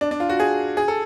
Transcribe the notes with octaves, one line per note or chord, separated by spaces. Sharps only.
D4
D4
F4
F#4
G#4
G#4
A4